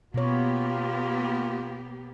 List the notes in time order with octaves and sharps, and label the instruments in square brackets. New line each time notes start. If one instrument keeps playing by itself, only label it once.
[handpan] B2 C#5 [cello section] A#3 B3 G4 [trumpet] F4